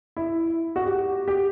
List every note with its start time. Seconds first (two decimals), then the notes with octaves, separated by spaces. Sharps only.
0.17 E4
0.76 F#4
0.86 G4
1.28 G4